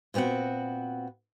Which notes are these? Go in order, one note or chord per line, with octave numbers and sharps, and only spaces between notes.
A#2 B3 C4 F#4 F#5